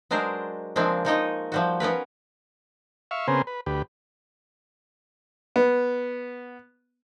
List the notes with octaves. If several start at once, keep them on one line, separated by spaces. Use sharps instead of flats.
F#3 G#3 D4 A#4 C5
C#3 F3 G#3 A#3 C4 D4
F3 G#3 D#4 A#4 C#5 D#5
F3 G3 F#4
B3 C#4 A#4 B4
E5 F5 C#6
C#3 B3 C4 G#4 A#4 C5
B4
D2 G4 B4
B3